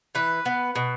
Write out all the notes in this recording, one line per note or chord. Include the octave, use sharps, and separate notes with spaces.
E3 B4
B3
B2